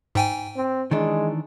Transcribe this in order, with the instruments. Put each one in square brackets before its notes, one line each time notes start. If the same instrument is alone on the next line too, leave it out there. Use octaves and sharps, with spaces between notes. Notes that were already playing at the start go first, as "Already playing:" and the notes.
[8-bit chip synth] G#2 G5 G#5
[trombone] C4
[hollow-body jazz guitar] D#3 E3 D4 [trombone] G#3